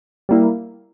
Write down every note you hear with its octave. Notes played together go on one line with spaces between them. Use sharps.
G3 A#3 E4